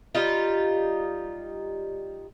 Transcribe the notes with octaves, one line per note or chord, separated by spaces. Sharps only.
G3 D#4 F4